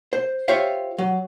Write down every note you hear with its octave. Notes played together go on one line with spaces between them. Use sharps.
C5
F4 G4 C5 C#5 E5 F5
F#3